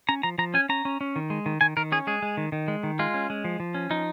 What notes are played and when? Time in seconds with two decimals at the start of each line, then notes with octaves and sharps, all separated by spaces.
0.09 C#4 A#5
0.23 F3 A#5
0.38 F3 A#5
0.54 C#4 G#5
0.69 C#4 A#5
0.85 C#4
1.01 C#4
1.16 D#3
1.30 G#3
1.46 D#3
1.61 D#3 G#5
1.77 D#3 A#4
1.92 C#4 G#4
2.07 G#3 G#4
2.22 G#3
2.37 D#3
2.52 D#3
2.68 G#3
2.83 D#3
2.99 G#3 F4
3.14 C#4
3.30 G#3
3.44 F3
3.60 F3
3.74 C#4
3.90 F3 D#4